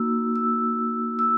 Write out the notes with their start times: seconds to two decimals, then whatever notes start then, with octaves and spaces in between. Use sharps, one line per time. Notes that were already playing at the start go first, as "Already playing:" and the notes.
Already playing: A#3 D#4 F#4 E6
0.36 E6
1.19 E6